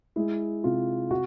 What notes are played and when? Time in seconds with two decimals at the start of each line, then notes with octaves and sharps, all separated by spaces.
0.16 G#3 E4
0.64 C3 F4
1.11 F#4